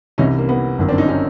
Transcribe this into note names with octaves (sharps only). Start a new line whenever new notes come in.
C2 C3 E3 C#4 D#4
A#3
B3
G1 F#2 D#3
C4 D4
C#4 D#4
C#4 D#4